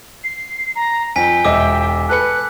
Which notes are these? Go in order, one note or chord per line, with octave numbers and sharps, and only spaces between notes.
C7
A#5
F2 G5 G#5 B6
E1 D#5 E5 D6 E6
A4 B4 F#6 C#7